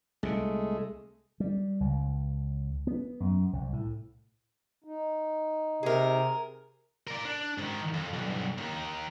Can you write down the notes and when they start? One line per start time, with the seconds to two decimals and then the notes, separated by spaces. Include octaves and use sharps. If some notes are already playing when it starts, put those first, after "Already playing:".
0.23 C2 A#2 G#3 A3
1.40 G3
1.80 C#2
2.87 B3
3.20 F#2
3.53 C2
3.73 A2
4.84 D#4
5.83 C3 G#4 A#4
7.07 A#4 D5
7.25 D4
7.58 G#2 D#3
7.94 F2
8.14 B1 G2
8.58 D#2 D#3